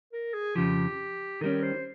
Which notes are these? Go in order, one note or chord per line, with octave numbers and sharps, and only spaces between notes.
A#4
G#4
F2 C#3 F3 G4
D#3 G3 C#4 A#4
C5